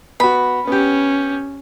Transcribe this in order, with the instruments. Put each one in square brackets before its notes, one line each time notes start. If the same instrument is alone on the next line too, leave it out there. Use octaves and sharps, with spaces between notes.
[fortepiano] B3 F#4 [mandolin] B5
[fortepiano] B3 G4 [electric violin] C#4